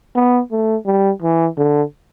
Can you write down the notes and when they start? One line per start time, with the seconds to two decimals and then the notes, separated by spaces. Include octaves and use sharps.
0.16 B3
0.51 A3
0.86 G3
1.22 E3
1.58 D3